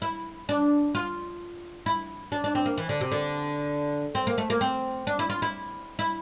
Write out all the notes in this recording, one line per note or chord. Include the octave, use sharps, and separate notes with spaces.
E4
D4
F4
E4
D4
D4
C4
A#3
E3
D3
C3
D3
C4
A#3
A3
A#3
C4
D4
E4
F4
E4
E4